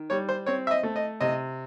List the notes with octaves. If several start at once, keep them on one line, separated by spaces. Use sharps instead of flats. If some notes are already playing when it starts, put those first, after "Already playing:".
Already playing: D#3
G3 C#5
C5
C4 C#5
E5
D#5
A3
D#5
C3 D#5